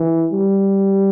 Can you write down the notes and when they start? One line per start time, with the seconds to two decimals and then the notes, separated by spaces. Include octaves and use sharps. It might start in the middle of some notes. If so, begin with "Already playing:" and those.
Already playing: E3
0.32 G3